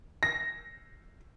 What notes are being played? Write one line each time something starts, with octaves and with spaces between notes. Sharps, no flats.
A#6